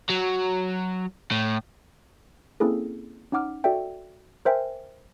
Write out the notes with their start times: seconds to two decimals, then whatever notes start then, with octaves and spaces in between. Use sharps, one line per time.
0.10 F#3
1.31 A2
2.60 A#3 C4 C#4 E4 G#4 A4
3.32 C#4 D#4 F#5 D6 F6
3.64 F#4 A4 D5 E5 G5
4.45 A#4 C5 E5 G5 G#5